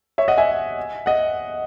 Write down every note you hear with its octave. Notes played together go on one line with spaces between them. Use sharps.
C#5 E5
D#5 F#5
E5 G#5
D#5 F#5